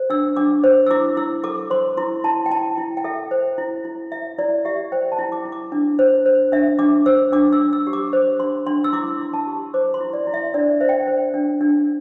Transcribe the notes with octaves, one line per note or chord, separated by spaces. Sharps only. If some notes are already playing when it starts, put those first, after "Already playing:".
Already playing: C5
D4 E6
D4 D6
C5 D6
E6
E4 D6
E4 E6
A4 D6
C5 C6
E4 C6
E4 A5
G5
E4 A5
E4
G5
A4 E5
C5
E4
E4
E4 E5
E4 D5
G4 E5
C5 G5
A5
E4
D6
E4
D6
D4
C5
C5
D4 E5
D4 D6
C5 E6
D4 D6
E6
D4
E6
G4
D6
C5
D4 C6
D4 C6
E6
E4 D6
E4 C6
A5
G4
C5 D6
C6
E4
D5
E4
E5
D4 D5
C5 E5
G5
E5
C5
D4
D4